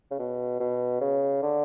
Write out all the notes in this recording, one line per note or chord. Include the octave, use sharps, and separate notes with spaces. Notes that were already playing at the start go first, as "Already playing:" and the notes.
C#3
B2
B2
C#3
D3